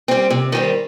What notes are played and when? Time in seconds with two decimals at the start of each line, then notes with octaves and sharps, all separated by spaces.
0.08 G3 C4
0.30 C3
0.52 D#3 G3 C4